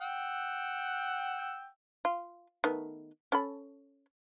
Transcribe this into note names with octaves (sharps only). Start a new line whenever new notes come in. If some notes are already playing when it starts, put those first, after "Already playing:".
F#5 G5 E6
F4
D#3 A3 B3
C#4 A4 B5